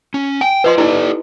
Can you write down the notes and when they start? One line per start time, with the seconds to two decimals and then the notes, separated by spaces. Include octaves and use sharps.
0.14 C#4
0.41 G5 G#5
0.64 F4 B4 C5 D#5 C6
0.78 D#4 E4 G4 A4 D5